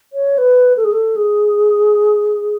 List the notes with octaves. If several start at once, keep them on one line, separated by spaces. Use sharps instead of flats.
C#5
B4
A4
G#4
A4
G#4